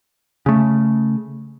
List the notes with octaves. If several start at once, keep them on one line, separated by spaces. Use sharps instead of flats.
C#3 A3